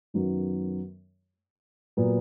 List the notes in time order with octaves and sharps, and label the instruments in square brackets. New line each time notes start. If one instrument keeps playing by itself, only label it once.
[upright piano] F#2 D#3 F#3 B3
A#2 F#3 B3